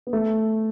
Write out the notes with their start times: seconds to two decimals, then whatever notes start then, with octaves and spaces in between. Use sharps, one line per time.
0.07 B3
0.13 A3